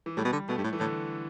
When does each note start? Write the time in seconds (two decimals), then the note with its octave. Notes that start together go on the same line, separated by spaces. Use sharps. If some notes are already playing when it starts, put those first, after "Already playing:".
0.06 E3
0.17 A2 G3
0.25 B2
0.32 D3
0.49 B2 A3
0.58 G2
0.64 A2
0.73 E3
0.80 A2 D3